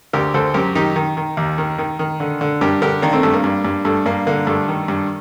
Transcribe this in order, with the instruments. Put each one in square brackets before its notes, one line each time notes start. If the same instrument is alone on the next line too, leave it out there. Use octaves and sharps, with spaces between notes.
[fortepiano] D2 G4 A#4
D2 A4 C5
F#2 G4 A#4
D#3 D#4 G4
D#3
D#3
D#2
D#3
D#3
D#3
D3
D3
G2 G4 A#4
D3 G4 A#4
D#3 A#3 D4
A3 C4
G2 A3
A#3
G2
G2
G2 A3
G2 A#3
D3 A#3
G2 A3
D#3
G2